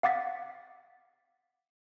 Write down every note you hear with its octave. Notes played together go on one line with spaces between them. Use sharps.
F5 F#5 D6 A6 B6